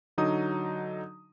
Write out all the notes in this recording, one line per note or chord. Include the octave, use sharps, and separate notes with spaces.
D3 F#3 D#4 D#6